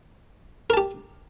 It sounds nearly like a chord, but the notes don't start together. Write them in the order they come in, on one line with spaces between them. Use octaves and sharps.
A#4 A5 G4